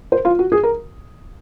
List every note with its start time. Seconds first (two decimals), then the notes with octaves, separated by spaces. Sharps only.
0.12 C5
0.25 F4
0.39 F#4
0.52 G#4
0.63 A#4